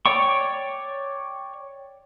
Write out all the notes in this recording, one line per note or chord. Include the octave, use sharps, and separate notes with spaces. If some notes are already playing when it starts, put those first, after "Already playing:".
C#5 D5 G5 C#6